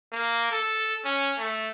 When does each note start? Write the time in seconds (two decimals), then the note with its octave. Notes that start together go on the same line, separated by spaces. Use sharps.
0.13 A#3
0.51 A4
1.05 C#4
1.39 A3